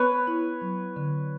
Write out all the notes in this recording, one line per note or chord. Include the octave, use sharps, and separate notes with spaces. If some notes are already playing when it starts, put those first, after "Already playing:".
Already playing: B3 B4 C#5
E4
F#3
D3